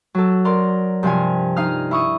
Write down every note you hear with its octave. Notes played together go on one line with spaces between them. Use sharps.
F#3 A4
A#4 D5 C6
G2 C3 F3 F4 G#5
D#4 F5 D#6 F6
E4 C#6 D#6